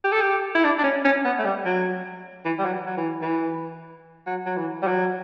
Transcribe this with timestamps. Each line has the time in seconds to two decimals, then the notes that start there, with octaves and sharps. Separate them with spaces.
0.04 G4
0.12 A4
0.21 G4
0.55 E4
0.64 D4
0.78 D4
0.84 C#4
1.05 C#4
1.25 B3
1.39 A3
1.45 G3
1.65 F#3
2.45 E3
2.59 G3
2.65 F#3
2.86 F#3
2.97 E3
3.22 E3
4.27 F#3
4.46 F#3
4.57 E3
4.82 G3
4.87 F#3